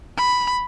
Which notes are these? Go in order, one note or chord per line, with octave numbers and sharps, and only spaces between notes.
B5